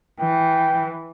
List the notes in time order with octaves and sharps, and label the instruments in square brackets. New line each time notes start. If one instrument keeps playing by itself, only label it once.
[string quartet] E3 [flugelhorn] G5